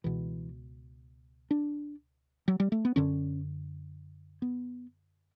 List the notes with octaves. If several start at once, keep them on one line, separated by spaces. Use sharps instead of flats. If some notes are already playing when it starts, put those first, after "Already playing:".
C#2 B2 E3
D4
F#3
G3
A3
B3
F#2 D3 C#4
B3